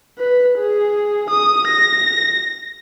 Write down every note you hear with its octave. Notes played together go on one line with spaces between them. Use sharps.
B4
G#4
D#6
A#6